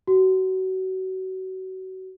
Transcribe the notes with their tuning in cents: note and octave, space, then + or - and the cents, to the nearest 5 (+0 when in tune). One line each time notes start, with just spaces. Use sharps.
F#4 +30